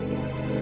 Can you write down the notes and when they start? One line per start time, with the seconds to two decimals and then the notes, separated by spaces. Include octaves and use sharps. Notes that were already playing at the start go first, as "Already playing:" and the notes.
Already playing: E2 C3 D#3 G#3 A4 B4
0.10 C5